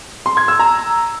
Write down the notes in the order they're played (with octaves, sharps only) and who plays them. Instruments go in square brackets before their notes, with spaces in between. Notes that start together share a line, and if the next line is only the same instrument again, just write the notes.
[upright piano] C6
G#6
E6
A#5